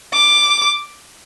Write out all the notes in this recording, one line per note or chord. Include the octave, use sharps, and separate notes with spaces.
D6